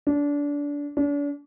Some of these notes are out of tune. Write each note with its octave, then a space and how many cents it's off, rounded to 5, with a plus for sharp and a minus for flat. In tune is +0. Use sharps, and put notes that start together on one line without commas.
D4 -25
D4 -40